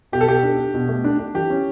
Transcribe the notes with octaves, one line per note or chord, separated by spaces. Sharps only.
B2 G4
A4
B2 G4
D4
D4
B2
A3
D4
D4
E3 G4
C#4